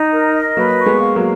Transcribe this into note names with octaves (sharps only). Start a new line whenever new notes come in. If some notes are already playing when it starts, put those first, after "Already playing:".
Already playing: D#4
A#4
D#5
F#3 A#3 B4
C#6
G#3 B3
F5
F#3 A#3